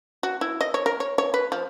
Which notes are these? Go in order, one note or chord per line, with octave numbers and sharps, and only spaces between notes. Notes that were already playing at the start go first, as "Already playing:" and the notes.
F#4
E4
D#5
C#5
A#4
C#5
C#5
B4
F3